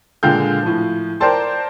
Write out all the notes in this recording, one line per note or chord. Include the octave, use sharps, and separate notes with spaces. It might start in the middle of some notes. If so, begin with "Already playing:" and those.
A#2 D3 G#3 F5 G5 G6
A2 F3
A#4 C5 D5 G5 A5 C6